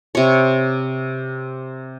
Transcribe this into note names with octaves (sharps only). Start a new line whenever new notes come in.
C3 C#5